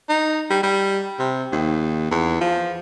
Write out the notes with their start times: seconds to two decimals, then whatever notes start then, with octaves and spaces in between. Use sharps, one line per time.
0.09 D#4
0.50 G3
0.63 G3
1.19 C3
1.52 D#2
2.11 E2
2.41 F3